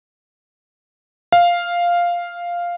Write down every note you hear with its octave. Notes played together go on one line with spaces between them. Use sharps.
F5